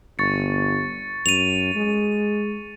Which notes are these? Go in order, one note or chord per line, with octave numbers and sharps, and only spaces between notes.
G1 C#6 A6 C#7
F#2 D#7 F7
G#3